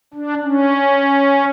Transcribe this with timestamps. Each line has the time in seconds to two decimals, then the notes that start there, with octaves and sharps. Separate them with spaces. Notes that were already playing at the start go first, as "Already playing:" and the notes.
0.14 D4
0.43 C#4